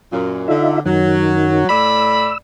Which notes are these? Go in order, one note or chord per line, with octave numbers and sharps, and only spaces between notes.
F#2 A#2
D3 D#4 F4 E5
F#2 D#3 F#3
A2 D5 B5 E6